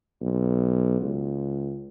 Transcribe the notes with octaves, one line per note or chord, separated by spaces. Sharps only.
B1
C#2